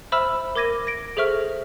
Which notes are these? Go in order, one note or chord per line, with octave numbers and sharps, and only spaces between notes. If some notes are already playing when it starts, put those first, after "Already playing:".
C5 E5 B5 E6 F6 E7
A#4 D6 G#6 A#6 D#7
A#6 D7
G#4 A4 C5 E5 C#6 F6